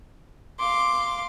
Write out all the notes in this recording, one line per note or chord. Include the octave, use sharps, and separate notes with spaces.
F5 C6 D6